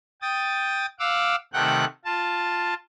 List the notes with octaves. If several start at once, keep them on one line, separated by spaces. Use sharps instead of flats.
G5 D#6 A6
F5 F#5 D6 E6
C3 D#3 A3 F#5 G5 F#6
F4 A5